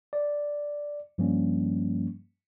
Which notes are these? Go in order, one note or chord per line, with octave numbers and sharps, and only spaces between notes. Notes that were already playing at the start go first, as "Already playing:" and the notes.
D5
G2 F3 G3 A#3 C#4